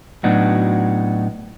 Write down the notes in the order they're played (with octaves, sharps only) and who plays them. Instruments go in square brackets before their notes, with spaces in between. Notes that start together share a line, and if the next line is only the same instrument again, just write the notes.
[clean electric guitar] A2 F#3 B3 D4 D#4 F#4